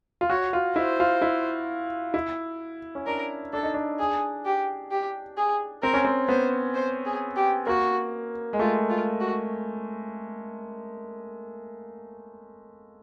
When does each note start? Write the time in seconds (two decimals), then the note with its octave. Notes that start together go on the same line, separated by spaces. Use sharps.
0.21 F4
0.30 F#4 C#5
0.53 F4
0.76 E4 C5
1.00 F4
1.22 E4
2.14 E4
2.95 C#4
3.06 D4 A#4
3.53 D4 A4
3.63 D#4
3.74 D4
3.99 G#4
4.45 G4
4.91 G4
5.37 G#4
5.82 C4 A#4
5.94 C#4
6.05 C4
6.29 B3 C5
6.74 C5
7.06 G#4
7.36 G4
7.67 A#3 F#4
8.53 G#3
8.59 A3 F4
8.90 F4
9.20 F#4